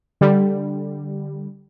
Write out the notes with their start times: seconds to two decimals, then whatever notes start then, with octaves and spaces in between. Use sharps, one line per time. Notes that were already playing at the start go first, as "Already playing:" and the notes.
0.21 D3 G3